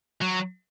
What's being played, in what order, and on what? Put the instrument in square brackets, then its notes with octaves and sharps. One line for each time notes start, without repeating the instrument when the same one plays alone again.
[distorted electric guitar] F#3